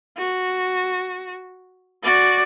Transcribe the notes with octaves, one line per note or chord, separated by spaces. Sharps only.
F#4
F#4 D5